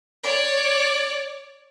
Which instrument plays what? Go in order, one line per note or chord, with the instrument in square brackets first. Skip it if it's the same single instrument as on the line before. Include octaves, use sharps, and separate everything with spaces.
[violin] C#5 D5